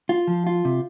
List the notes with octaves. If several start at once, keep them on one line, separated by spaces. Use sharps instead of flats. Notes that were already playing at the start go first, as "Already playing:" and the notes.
F4
F3
F4
C3